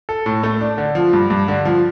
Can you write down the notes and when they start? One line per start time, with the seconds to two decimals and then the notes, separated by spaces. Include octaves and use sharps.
0.09 A4
0.26 A2
0.43 A3
0.61 D4
0.78 D3
0.95 F3
1.13 G2
1.30 G2
1.48 D3
1.65 F3